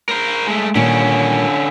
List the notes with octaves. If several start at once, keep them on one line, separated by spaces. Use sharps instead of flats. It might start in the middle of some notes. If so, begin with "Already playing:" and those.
A#4 C5
G#3 A3
A#2 D3 D#3 G3 C#4